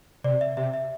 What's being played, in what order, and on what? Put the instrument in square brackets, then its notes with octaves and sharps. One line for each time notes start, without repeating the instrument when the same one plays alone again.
[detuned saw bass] C3 [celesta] D5
[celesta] E5
[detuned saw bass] C3 [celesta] E5
[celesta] E5